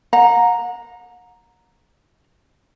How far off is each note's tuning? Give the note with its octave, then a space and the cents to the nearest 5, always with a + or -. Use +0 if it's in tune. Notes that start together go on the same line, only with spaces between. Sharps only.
F#5 -40 A#5 +0